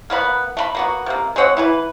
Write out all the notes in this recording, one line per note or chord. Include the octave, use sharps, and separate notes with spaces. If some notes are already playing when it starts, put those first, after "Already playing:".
A#3 B3 C#5 B5
A3 B5
A#3 B3 F#4
C3 A#3
G#3 C4 C#5 F#5
E3 E4 B4